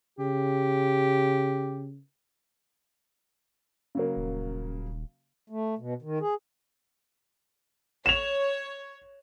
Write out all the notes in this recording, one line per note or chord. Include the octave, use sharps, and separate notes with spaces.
C#3 G4
C#3 F#3 A#3
D#1
A3
B2
D#3
G#4
C#5 E7 F7